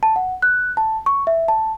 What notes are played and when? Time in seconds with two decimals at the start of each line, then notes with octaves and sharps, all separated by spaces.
0.03 A5
0.16 F#5
0.42 F#6
0.77 A5
1.06 C#6
1.27 E5
1.48 A5